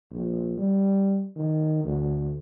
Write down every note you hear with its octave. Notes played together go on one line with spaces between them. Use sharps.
A#1
G3
D#3
D2